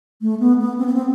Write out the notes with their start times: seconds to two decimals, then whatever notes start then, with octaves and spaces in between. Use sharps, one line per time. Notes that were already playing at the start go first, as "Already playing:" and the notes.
0.21 A3
0.40 B3
0.59 B3
0.78 C4
0.86 B3
0.94 C4